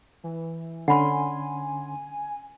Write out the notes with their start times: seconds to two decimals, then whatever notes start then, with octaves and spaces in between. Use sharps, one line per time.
0.24 E3
0.88 D3 C#4 F#5 G#5 B5 C6